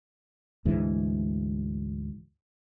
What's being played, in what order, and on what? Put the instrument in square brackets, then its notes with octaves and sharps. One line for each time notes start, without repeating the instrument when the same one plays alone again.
[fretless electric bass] D2 G#2 E3